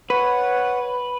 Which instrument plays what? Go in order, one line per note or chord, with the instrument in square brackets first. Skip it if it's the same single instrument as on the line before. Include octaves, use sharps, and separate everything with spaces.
[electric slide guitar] B4 [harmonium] C#5 F#5